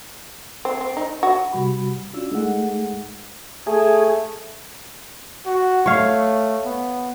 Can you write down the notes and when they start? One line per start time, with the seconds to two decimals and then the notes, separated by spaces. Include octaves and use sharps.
0.65 C4
0.81 C4
0.97 D#4
1.23 F#4
1.52 C3 G3 F#4 B5
2.13 C#4 D4 F4 F#4 E6
2.31 G#3 A3 D#4 G#4 F#5
3.67 A3 G#4
5.46 F#4
5.86 A3 C#5 F5
6.65 B3